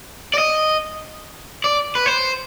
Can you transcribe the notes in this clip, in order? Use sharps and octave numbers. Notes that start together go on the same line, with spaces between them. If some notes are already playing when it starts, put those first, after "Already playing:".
D5
D#5
D5
B4
C5